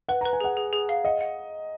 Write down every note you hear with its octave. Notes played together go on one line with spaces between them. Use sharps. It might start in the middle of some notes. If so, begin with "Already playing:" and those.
B4 F#5
A#5
B4
G#5
G#4 F#5
G#4
G#4
F5
D#5 F#5
F#5